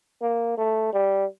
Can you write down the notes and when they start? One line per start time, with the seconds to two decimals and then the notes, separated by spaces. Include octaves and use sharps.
0.22 A#3
0.57 A3
0.93 G3